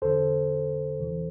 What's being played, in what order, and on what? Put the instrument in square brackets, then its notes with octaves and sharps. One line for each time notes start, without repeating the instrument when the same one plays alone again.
[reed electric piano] E2 D3 A4 C5
E2 C3 E3